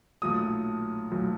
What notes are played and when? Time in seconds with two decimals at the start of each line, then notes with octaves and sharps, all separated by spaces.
0.22 B1 A#2 F#3 A3 D#6
1.11 B1 A#2 F#3 A3